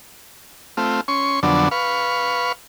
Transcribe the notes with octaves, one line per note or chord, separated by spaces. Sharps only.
A3 C4 F4
C#4 C6 C#6
F2 D3 F#3 B3 D4
B4 F5 C#6